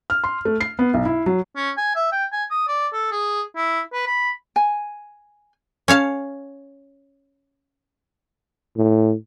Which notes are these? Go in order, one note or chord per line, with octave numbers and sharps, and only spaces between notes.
F6
C6
A3
C7
B3
B1
E4
F#3
C#4
G#5
E5
G5
G#5
D#6
D5
A4
G#4
E4
B4
B5
G#5
C#4 C#5 F5 A5
A2